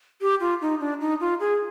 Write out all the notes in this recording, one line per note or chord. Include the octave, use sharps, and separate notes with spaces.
G4
F4
D#4
D4
D#4
F4
G#4